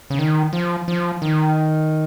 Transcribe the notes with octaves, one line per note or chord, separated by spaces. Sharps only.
C#3
D#3
F3
F3
D#3